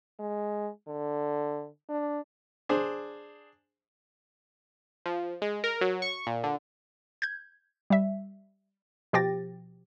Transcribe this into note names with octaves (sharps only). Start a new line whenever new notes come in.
G#3
D3
D4
D4 G#4 C5
F3
G#3
A#4
F#3
C#6
A#2
D3
G6 G#6
G3 E5
B2 F3 G4 G5 A6 A#6